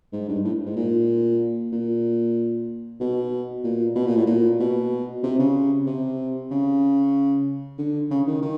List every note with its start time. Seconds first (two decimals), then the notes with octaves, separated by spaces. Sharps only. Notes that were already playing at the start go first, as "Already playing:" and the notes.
0.13 G#2
0.28 G2
0.44 A2
0.66 G#2
0.76 A#2
1.72 A#2
3.00 B2
3.64 A#2
3.95 B2
4.06 A#2
4.16 A2
4.26 A#2
4.60 B2
5.23 C3
5.39 C#3
5.86 C3
6.51 C#3
7.79 D3
8.11 C#3
8.27 D#3
8.42 D#3